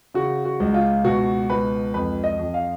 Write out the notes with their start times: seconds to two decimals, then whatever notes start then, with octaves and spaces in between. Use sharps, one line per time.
0.14 C#3 F#4
0.45 F#4
0.60 C#2
0.74 F4
1.04 B2 F#4
1.49 C#2 B4
1.94 F2 B4
2.24 D#5
2.39 F2
2.54 F5